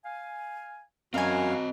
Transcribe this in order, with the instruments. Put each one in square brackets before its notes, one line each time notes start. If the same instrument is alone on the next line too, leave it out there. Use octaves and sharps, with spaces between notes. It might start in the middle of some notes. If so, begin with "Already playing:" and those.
[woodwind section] F5 G#5
[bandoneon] F#2 F5 [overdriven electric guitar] C4 D#5 [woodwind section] F#4 [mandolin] A#4 G#5